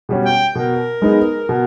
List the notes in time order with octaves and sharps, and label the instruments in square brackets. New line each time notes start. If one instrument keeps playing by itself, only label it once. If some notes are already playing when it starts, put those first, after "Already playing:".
[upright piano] B2 G3 C#4
[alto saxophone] G5
[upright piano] B2 [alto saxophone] A#4
[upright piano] G#3 B3 D#4 G#4
B2